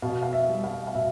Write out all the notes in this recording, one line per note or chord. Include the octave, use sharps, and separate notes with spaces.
B2 F5
F5
E5
G3
F5
F5
B2 E5